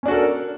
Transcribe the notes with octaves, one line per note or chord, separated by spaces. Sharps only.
C#4 D4 F#4 A4 A#4